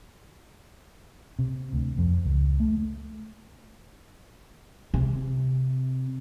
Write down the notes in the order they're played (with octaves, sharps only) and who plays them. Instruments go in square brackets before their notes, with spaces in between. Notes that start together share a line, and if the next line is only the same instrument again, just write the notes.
[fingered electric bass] C3
D2
F2
C#2
A3
[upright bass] C3